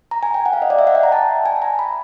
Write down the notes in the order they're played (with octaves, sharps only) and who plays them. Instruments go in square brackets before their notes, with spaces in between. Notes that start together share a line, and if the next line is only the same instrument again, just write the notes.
[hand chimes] A#5
G#5
G5
F#5
F5
D#5
D5
E5
F#5
G5
A#5
A5
G#5
A#5
B5